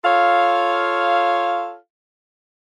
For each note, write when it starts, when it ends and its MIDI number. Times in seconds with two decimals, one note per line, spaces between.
0.04 1.76 65
0.04 1.76 69
0.04 1.76 73
0.04 1.76 77